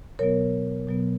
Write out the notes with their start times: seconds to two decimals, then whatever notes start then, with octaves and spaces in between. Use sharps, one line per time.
0.19 B2 F#3 B3 A#4 C#5
0.87 B2 F#3 B3